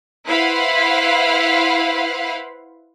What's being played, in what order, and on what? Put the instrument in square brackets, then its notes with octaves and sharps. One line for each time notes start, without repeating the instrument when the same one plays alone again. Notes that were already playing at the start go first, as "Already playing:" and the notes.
[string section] E4 B4 C5 F5 F#5 B5